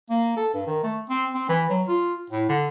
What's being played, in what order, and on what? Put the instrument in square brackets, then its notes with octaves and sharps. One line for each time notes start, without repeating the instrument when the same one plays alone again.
[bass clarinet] A#3
A4
G2
D#3
A3
C4
C4
E3
F#3
F4
A2
D3